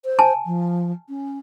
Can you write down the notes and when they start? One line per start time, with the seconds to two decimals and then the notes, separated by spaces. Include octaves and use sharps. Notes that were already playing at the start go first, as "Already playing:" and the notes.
0.05 C5
0.19 G#5 A5
0.46 F3
1.09 C#4